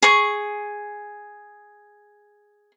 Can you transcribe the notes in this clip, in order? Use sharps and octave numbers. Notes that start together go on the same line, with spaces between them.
G#4 C#6